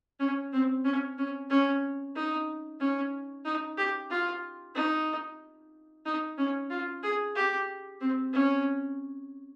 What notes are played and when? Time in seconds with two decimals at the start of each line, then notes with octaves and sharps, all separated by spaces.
0.20 C#4
0.53 C4
0.85 C#4
1.18 C#4
1.50 C#4
2.15 D#4
2.80 C#4
3.45 D#4
3.78 G4
4.10 F4
4.75 D#4
6.06 D#4
6.38 C#4
6.70 F4
7.03 G#4
7.36 G4
8.01 C4
8.33 C#4